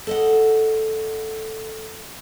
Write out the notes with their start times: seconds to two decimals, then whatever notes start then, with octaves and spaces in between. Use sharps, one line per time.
0.07 A4 D#5 F#5